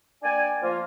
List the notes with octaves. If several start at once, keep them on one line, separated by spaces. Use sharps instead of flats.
A#3 D4 D5 G5 G#5
F3 A#3 F4